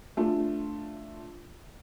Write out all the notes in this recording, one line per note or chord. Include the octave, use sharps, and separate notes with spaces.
A3 D4 F4